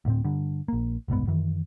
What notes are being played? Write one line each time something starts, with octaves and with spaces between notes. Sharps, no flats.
D2 A2 C4
G2 D3
A#1 A#3
F#1 C2 G#2 B3
F#2 D#3 E3